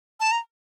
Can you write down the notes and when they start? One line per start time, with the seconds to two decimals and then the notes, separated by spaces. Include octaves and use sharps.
0.20 A5
0.32 A#5